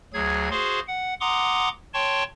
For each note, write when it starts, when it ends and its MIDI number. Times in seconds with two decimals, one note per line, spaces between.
0.13 0.49 38
0.13 0.49 54
0.13 0.49 68
0.13 0.49 92
0.51 0.80 66
0.51 0.80 68
0.51 0.80 72
0.51 0.80 77
0.51 0.80 84
0.88 1.14 78
1.21 1.69 78
1.21 1.69 82
1.21 1.69 84
1.21 1.69 86
1.21 1.69 87
1.94 2.24 73
1.94 2.24 79
1.94 2.24 81
1.94 2.24 84
1.94 2.24 85